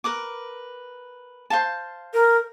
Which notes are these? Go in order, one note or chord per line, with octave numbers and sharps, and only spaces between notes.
A#4 B4 D6
C5 F5 A5
A#4